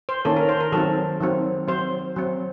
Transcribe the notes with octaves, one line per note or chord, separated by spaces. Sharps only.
C5
D#3 A#3 C#4 A4
A#4
C5
A#4
D#3 F#3 C4 A4
D#3 F#3 C4
F#3 C4 C5
F#3 C4